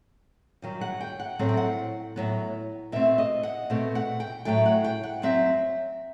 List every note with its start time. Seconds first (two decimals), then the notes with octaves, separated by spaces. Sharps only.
0.62 G2 D#3 F#3
0.81 F#5
1.01 G5
1.20 F#5
1.39 A2 F#3 A3 C4 F#5
1.49 G5
1.57 F#5
2.16 A2 F#3 B3
2.92 B2 A3 C4 E5
3.18 D#5
3.43 F#5
3.70 B2 A3 C4
3.95 F#5
4.20 G5
4.45 A2 F#3 A3 G5
4.66 F#5
4.84 G5
5.03 F#5
5.22 F#2 F#3 C4 E5